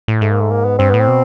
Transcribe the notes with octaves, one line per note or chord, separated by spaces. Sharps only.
A2
G#2 A3
A#3
A3
A#3
B3
G2 C4
A2 B3
C4
B2